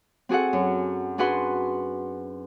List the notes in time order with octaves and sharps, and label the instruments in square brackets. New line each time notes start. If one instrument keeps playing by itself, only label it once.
[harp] C4 F#4 G#4 A4 F#5
F#2
D4 F#4 G#4 B4 F#5 C6